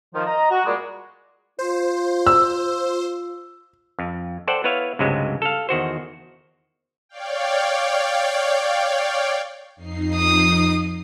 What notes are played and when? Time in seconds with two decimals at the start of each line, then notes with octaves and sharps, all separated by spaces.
0.14 D#3 F3
0.26 D#5 A#5
0.51 F#4
0.65 A#2 G3 G#3
1.59 F4 C5
2.27 E6
3.99 F2
4.47 A4 C5 D5 F#5 G5
4.64 B3 E4 B4 C#5 E5 F5
4.99 C#2 G2 C3 F#3 G#3
5.42 A4 F5
5.69 E2 D#3 F#4 C5
7.09 C#5 D5 F5 G5
9.76 F2 D#4 C7
10.16 D#6